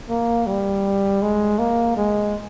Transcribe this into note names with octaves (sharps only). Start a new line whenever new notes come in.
A#3
G3
G#3
A#3
G#3